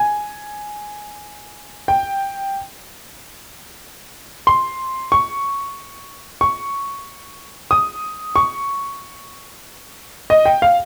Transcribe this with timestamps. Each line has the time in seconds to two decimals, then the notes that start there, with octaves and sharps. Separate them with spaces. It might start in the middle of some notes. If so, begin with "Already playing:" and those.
Already playing: G#5
1.88 G5
4.47 C6
5.12 C#6
6.41 C#6
7.71 D#6
8.36 C#6
10.30 D#5
10.45 G5
10.62 F5